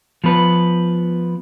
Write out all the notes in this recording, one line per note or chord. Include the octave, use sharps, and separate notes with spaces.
F3 B3 B4